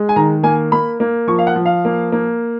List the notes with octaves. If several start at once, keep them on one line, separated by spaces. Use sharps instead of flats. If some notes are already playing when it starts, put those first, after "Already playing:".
Already playing: G#3
G#5
D#3 A#5
A#3 G#5
A#3 B5
A#3
F3 C#6
F5
F#5
F3
F5
A#3
A#3